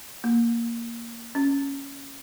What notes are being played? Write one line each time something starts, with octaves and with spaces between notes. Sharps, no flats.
A#3
C#4